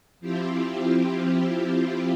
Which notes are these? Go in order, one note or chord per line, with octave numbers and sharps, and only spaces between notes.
F3 C4 E4 F4 G4